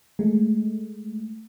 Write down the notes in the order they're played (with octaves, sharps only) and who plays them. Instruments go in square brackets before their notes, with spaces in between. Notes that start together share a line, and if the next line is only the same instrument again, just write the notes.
[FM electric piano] G#3 A3